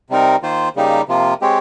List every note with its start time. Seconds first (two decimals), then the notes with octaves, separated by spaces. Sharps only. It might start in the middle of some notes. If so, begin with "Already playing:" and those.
0.10 C3 G3 C4 D#4 A#4
0.42 D#3 A#3 F4 C5
0.76 C#3 G3 A#3 D#4 G4
1.08 C3 F3 A#3 F4
1.41 G#3 C4 G4 C#5